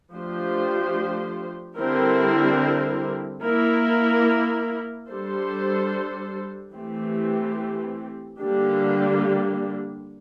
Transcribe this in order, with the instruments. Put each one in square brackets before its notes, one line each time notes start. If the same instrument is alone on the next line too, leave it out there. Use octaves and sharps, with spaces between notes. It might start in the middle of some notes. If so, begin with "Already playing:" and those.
[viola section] F3 A3 D4 G4 C5
D3 G3 C4 E4 A#4
A#3 E4 A#4
G3 D4 A4 C5
E3 A3 C4 G4
D3 G3 A#3 D4 G4